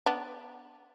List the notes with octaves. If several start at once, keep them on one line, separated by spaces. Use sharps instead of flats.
B3 D4